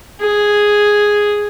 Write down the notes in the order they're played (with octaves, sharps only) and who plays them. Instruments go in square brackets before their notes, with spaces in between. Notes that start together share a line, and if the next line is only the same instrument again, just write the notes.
[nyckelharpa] G#4